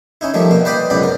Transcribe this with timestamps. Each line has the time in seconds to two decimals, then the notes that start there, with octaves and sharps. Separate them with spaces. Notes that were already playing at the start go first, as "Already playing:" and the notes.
0.21 C#4 D#4 E4
0.34 D#3 F3 G3 A3
0.51 B2 A#3
0.65 B4 C5 D5 D#5 G5 B5
0.90 C#2 F#2 B2 D5 B5
1.03 A#4